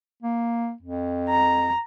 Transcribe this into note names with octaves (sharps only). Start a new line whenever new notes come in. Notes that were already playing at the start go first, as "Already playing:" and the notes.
A#3
F2
A#5